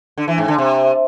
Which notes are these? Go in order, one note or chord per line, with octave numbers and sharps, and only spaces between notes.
D3
E3
G#2
D3
C3